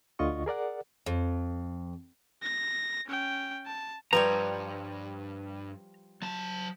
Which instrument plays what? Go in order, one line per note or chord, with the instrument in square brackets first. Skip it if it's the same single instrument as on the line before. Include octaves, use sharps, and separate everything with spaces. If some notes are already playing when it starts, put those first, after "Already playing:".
[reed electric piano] D2 D3 F4 D#5 C#6
G#4 A#4 D5 F#5
[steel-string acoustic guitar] F2
[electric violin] A#6
C#4 G5
A5
[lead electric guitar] E2 G2 [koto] F3 G3 C#5 [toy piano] B4 [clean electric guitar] A#5
[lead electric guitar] F#3 A5